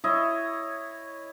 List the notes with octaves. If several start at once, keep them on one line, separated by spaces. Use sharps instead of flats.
E4 C#5 D#5